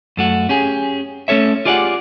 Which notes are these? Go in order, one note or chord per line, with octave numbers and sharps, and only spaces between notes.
F#2 A3 F#4
C#4 G4 G#4
A3 C#4 A4 C#5 E5
F4 G4 G#4 D5 D#5 F#5